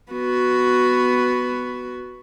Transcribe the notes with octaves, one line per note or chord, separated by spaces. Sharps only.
B3 F#4